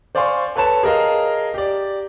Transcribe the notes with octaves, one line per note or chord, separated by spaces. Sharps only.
C5 D5 F5 G#5 C6 C#6
A4 B4 C#5 A5 E7
G#4 A#4 D#5 F5
G4 D5